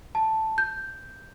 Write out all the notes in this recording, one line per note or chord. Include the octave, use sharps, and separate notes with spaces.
A5
G6